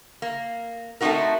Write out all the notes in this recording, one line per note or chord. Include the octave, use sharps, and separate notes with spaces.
A#3
A3 C4 C#4 D#4 F#4 A#4